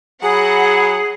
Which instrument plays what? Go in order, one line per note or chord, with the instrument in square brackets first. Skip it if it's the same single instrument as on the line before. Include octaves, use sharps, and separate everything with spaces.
[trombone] F#3 [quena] G#4 [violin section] F#5 [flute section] G#5 B5 D#6